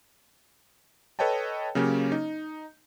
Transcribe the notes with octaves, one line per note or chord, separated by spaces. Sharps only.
A4 B4 C#5 D#5 G5 A5
C#3 F#3 A#3 C#4 G4
D#4